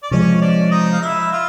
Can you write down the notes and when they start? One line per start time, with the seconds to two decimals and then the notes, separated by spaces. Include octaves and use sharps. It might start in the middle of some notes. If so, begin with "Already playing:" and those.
0.03 D5
0.11 C3 F3 G#3 C#4 C#5
0.42 D4 D5
0.71 D#4 D#5
0.93 F5
1.02 E4 E5
1.32 F4 F5